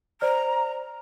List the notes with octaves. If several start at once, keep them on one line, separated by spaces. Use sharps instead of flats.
C5 D5 A#5 F6